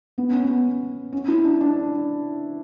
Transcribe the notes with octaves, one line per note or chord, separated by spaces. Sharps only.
B3
C#4
B3
C#4
E4
D4
D4